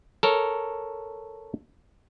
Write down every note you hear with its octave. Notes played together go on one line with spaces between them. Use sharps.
A4 A#4 C#5